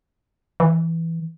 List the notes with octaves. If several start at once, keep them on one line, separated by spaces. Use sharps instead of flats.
E3